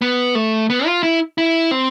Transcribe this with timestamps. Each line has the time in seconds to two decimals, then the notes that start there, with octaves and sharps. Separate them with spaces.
0.01 B3
0.35 A3
0.70 B3
0.86 F4
1.03 E4
1.38 E4
1.71 C4